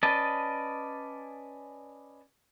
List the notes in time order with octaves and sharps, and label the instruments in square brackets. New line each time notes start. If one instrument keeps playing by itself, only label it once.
[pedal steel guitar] C#4 B4 D5 D#5 A5